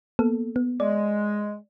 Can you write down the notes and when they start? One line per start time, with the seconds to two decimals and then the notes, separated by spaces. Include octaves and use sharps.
0.19 A#3 B3 A4
0.56 B3
0.80 G#3 D5